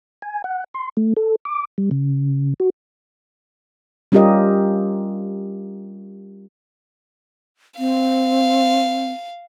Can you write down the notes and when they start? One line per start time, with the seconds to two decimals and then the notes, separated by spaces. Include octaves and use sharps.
0.22 G#5
0.44 F#5
0.74 C6
0.97 A3
1.17 A4
1.45 D6
1.78 G3
1.91 C#3
2.60 F#4
4.12 G3 C#4 F4 G4 A#4 D#5
7.79 C4 F5